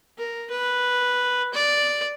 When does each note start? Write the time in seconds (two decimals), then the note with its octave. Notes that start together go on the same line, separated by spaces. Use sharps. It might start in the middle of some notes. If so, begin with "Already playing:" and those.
0.18 A#4
0.51 B4
1.54 D5